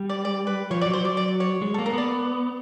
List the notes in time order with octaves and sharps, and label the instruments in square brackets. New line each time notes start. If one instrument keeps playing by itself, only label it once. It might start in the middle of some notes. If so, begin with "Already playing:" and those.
Already playing: [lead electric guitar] G3
[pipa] D5
D5
B4
[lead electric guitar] F3 [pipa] C#5
[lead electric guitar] F#3 [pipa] D5
[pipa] C5
[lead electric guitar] F#3 [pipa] D5
[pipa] D5
C#5
[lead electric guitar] G#3
[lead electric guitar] A#3 [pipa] A4
[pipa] A#4
[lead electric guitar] B3 [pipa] D5